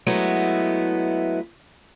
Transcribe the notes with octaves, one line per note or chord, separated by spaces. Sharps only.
F#3 G#3 A3 B3 E4